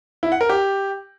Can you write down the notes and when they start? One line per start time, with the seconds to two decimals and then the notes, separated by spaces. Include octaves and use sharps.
0.23 E4
0.32 F#5
0.41 A#4
0.49 G4